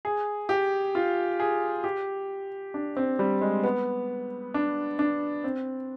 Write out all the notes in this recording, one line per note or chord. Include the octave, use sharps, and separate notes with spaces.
G#4
G4
F4
G#4
G4
D4
C4
G3
G#3
B3
D4
D4
C4